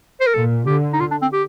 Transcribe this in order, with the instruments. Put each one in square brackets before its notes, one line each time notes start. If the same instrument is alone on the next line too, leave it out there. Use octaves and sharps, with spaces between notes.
[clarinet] C5
A#4
[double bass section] A#2 [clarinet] A4
[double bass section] D3 [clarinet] G4
[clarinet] D#4
F4
D4
C4
G4